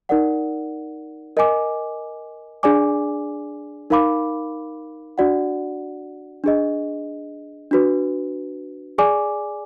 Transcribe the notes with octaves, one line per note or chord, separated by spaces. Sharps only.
D#4 A#4 D5 F#5
A#4 D#5 G#5 D6
D4 G#4 D5 G#5 D6
D#4 A#4 F5 B5 D6
D4 F#4 D5 F#5
D4 G#4 D#5
D4 F#4 B4
G#4 D5 G#5 D6